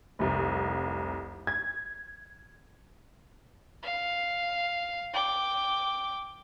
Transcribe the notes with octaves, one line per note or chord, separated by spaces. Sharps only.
F1 C2
G#6
F5
G5 D6